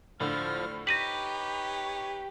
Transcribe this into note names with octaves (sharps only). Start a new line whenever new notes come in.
A2 D3 F3 F6
D#4 G4 B4 C#5 A#6 B6 D#7 F#7